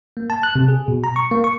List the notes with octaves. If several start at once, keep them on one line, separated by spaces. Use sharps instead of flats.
A#3
A5
F#6
C3
G#4
B2
A#5
C#6
A#3
C#6